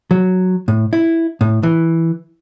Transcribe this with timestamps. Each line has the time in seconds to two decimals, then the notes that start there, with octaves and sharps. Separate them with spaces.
0.11 F#3
0.68 A2
0.93 E4
1.41 A2
1.63 E3